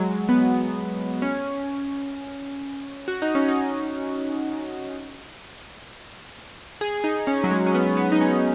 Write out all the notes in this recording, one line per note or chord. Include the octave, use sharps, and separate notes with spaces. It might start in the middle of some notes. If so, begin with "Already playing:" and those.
Already playing: F#3 G#3
B3
C#4
F#4
D#4
C#4
D#4
G#4
D#4
C#4
F#3
G#3
C#4
B3
B3
D#4
C#4